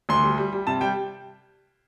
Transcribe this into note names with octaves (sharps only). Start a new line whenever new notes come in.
D2 C6
G3
G3
G3
C3 A5
G3 G5